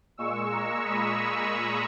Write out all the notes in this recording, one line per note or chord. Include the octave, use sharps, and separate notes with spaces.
A#2 G#3 C#6 E6
A#5 C#6
B5 D#6